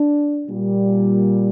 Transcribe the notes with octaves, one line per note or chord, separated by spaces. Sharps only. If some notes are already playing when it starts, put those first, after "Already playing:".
Already playing: D4
A#2 G3